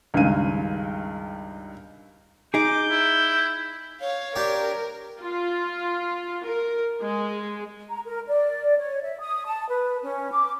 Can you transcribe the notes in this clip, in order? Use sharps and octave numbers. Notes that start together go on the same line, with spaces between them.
C#2 G2 D#3 G#3 D#7
D#4 G#4 D6 G6
E4
C#5 F5
D4 G4 A#4
F4
A#4
G#3
A#5
A#4
D5
C#5
E5
D#6
A5
B4
C#4
D6